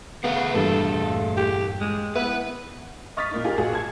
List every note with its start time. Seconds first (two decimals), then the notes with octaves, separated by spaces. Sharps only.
0.24 A3 B3 G#4 F5
0.55 E2 G2 A#2 A4
1.37 G4
1.81 G#3
2.16 B3 E4 B4
3.17 D#5 C#6 D#6 F6 A6 B6
3.31 A#2 A#3 D#4
3.44 A#3 D#4 F4 G4 G#4
3.57 A1 F#4 G#4
3.73 A5 G#6